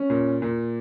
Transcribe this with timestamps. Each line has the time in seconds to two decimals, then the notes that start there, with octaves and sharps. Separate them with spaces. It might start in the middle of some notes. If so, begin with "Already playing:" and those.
Already playing: C#4
0.10 A#2
0.42 A#2